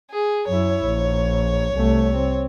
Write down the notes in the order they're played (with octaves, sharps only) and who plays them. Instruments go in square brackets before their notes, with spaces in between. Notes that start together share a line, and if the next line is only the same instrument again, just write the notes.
[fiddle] G#4
[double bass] F#2 E4 [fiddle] C#5
[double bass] A#1
C2 A3
C4